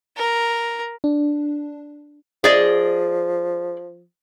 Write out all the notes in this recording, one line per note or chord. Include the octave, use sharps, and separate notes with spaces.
A#4
D4
F3 G#4 D5 D#5